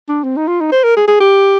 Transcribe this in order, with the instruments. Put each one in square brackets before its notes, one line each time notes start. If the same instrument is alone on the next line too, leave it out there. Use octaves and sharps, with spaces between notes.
[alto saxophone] D4
C4
D#4
F4
D#4
C5
A#4
G#4
G#4
G4